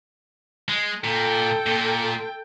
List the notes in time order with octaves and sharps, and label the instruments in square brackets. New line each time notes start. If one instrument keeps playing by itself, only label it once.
[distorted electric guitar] G#3
[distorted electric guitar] A#2 [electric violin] A4 G5
[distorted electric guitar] A#2